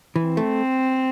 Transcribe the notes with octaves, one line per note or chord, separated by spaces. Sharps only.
E3
C4
A3